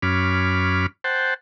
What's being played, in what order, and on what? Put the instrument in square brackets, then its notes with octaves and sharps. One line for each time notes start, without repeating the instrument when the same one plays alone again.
[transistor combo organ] F#2 C#4 B5 D6 F6
C5 F#5 G5 A5